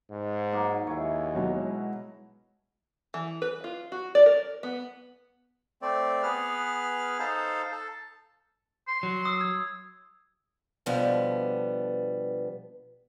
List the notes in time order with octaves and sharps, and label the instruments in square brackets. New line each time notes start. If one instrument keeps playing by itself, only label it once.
[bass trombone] G#2
[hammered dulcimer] F#3 A#3 D#4
[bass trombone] D#2 [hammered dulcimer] E4 G#4 C#5
[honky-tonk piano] B2 F#3 [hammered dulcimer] G#3 F#4
[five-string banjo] E3
B4
F4
F#4
D5
A#4
B3
[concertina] A3 C4 D5
B3 G#4 B4 F6
D#4 A4 C5 F5
A4
[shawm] C6
[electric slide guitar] F#3
[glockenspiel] D#6 E6
D#6 E6 G#6
[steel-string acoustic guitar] B2 D3 F3 G3 B3